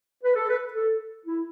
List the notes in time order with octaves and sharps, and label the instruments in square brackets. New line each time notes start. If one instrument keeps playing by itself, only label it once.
[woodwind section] B4
A4
B4
A4
E4